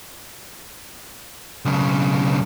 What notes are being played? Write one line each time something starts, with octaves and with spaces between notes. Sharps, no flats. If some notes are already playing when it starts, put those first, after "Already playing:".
B1 C#3